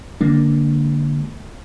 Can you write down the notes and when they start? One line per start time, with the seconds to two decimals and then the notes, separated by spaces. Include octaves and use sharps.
0.21 D3 G#3 A#3 D4